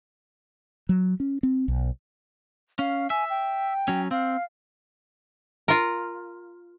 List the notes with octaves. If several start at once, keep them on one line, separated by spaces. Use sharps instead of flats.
F#3
C#4
C4
B1
C#4 F5
E5 G#5
G5
F#3 C#4
C4 F5
F4 A#4